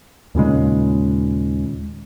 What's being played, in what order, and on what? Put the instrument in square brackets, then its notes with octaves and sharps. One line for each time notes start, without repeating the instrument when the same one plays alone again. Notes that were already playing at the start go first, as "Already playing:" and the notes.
[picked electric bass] D#2 A#2 C#3 G#3